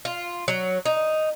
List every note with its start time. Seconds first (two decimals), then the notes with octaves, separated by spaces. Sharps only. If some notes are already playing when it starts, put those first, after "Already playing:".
0.05 F4
0.48 F#3
0.86 D#4